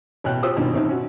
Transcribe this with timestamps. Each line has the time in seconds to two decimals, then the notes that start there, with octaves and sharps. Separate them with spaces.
0.24 A1 B2 C#5 G5 F#6
0.43 F4 G4 C5 D#6 E6
0.56 G2 B2 D#3 C#4 D4 F4
0.74 A1 C4 D#4
0.89 C#4 F#4